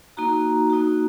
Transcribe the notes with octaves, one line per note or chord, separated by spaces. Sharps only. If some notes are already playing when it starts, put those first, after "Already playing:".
A#3 D#4 F#4 A#5
A#3 D#4 F#4